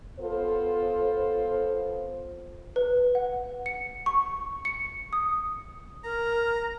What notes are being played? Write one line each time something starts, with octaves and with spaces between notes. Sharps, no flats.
B3 F4 A4 C5
B4
F#5
C#7
C#6
C#7
D#6
A#4 A#5